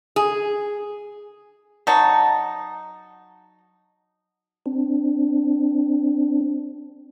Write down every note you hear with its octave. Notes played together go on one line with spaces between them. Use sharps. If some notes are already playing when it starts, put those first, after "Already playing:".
G#4
F#3 D#4 A5
C4 D4